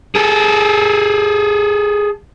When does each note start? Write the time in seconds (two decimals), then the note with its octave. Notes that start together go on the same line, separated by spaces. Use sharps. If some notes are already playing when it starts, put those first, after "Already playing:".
0.15 G#4 A4